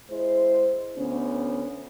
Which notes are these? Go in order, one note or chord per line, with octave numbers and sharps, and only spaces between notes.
G#3 E4 C5
D2 B3 C#4